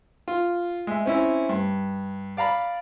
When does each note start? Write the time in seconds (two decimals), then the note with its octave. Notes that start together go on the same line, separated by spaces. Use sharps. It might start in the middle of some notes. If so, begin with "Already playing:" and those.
0.28 F4
0.87 G#3 E5
1.06 C4 C#4 E4
1.49 G2
2.37 D5 F5 A#5 B5